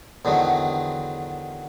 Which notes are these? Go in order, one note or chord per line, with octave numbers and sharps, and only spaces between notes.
E2 D3 D#3 F#3